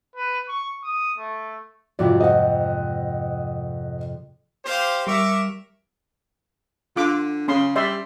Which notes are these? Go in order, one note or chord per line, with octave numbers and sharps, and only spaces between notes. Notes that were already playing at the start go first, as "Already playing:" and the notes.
B4
C#6
D#6
A3
F2 G#2 C3 F4 F#4 D5
D#5 F#5
G4 C5 F5
G3 A#4 E5 C#6 D6
D3 F4 D6
C#3 C#4 C6
G3 D5 E5 C6